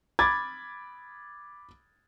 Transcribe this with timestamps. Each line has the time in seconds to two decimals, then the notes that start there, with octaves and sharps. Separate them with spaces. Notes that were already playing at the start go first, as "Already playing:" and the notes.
0.19 B5 D6 G#6 A6